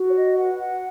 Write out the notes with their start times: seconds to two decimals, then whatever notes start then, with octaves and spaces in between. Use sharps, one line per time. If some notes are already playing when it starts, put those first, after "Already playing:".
Already playing: F#4
0.08 C#5
0.14 D#5
0.36 B4 F#5
0.58 F#5